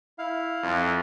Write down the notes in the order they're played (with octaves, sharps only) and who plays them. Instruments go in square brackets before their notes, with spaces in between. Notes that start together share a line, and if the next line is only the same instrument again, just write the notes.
[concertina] E4 F5
[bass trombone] F2